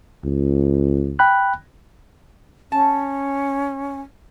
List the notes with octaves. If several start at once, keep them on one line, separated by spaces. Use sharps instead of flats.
C#2
G5 B5 F#6
C#4 A5